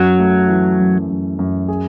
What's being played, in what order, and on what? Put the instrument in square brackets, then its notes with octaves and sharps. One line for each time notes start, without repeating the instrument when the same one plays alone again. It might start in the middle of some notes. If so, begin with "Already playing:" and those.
Already playing: [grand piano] F#2 [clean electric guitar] F#3
[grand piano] A3
E3
F#2
F#2
F#2
G#4